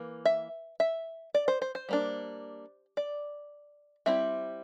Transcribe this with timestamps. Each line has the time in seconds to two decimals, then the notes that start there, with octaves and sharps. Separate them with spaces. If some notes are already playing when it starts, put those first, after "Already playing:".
Already playing: E3 A#3
0.25 E5
0.80 E5
1.34 D5
1.48 C5
1.62 C5
1.75 C5
1.89 G3 A#3 D4
2.97 D5
4.06 G3 C4 E4 E5